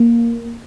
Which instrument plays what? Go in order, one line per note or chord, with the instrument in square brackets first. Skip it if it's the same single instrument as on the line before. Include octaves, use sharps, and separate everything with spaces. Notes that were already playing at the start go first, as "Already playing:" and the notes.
Already playing: [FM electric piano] A#3